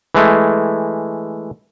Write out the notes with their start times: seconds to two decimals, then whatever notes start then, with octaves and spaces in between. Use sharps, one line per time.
0.15 E3 G#3 A3